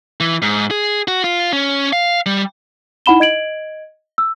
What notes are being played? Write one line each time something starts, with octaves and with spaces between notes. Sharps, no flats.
E3
G#2
G#4
F#4
F4
C#4
F5
G3
D#4 E4 F#5 B5 E7 G7
D#5 G#6 D7 F#7
E6